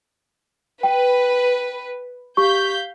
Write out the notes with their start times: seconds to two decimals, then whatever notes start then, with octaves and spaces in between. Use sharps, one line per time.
0.83 B4 G5
2.37 G4 F5 C#6 G6 B6